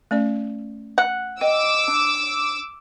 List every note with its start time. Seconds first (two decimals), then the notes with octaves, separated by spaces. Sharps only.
0.11 A3 C#4 D5
0.98 F#5
1.41 D#5 G5 D6 E6
1.88 D4